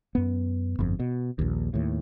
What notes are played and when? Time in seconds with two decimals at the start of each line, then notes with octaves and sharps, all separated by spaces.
0.15 F#2 B3
0.79 G1 F2
0.99 B2
1.39 A#1 D#2
1.74 D#2 A2